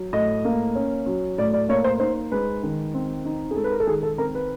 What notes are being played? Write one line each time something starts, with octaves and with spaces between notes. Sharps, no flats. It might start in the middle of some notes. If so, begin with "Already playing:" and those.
Already playing: F#3
A2 D#5
A#3
C#4
F#3
A2 D5
D5
A#3 C#5
C5
D#4 C5
G#3 B4
D#3
C4
D#4
G#4
G#3 A4
B4
A#4
A4
D#3 G#4
A4
C4 A#4
B4